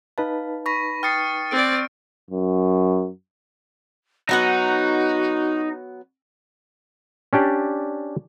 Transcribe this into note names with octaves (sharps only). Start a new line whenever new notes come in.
D#4 B4 F5 A5
B5 C#6 A#6 B6
G5 D#6 F6 A6 C7 C#7
C4 D5 D7
F#2
F#3 B3 D#4 F#4 F#5
C#4 D4 G4 D5